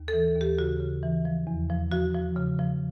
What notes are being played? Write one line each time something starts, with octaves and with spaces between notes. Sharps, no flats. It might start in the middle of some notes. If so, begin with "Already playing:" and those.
Already playing: D#2
A4
E3
D#2 G4
C#3 F#4
C#3
E3
F3
E2
F3
F3 F#4
F3
C#3
F3